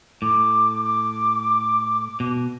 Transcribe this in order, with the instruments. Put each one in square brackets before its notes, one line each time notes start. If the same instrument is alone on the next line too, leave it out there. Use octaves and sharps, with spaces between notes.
[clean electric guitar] A2 [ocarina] D6
[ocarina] D6
[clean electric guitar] B2